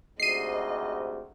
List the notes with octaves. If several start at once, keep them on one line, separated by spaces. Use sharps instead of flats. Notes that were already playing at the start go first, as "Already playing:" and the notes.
D2 G#2 C3 D#5 C7 D#7